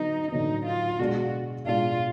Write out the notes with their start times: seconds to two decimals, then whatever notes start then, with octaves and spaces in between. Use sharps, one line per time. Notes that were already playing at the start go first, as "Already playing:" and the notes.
Already playing: D3 F#3 B3 D#4
0.32 D3 F#3 B3 D#4
0.66 F4
0.99 B2 G#3 D4 F#4
1.66 B2 G#3 D4 F4